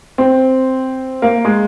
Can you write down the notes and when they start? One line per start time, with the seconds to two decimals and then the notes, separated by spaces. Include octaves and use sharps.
0.18 C4
1.22 A#3
1.45 G#3